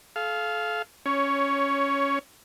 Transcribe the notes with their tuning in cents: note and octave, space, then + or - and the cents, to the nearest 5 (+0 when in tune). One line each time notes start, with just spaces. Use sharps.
A4 -35 F5 -5
C#4 +0 C#5 +15